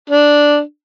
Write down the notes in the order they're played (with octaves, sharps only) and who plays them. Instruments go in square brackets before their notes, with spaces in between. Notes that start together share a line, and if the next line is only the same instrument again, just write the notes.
[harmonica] D4